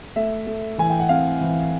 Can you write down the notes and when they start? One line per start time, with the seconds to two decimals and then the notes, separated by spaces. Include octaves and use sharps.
0.16 A3 E5
0.47 A3
0.78 E3 G#5
0.90 G5
1.00 F#5
1.09 C4 F5
1.41 E3